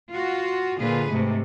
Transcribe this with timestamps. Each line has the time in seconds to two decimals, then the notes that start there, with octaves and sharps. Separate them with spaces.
0.11 F4 F#4
0.80 A#2 D3 F4 G#4 B4
1.10 G#2 C3 A3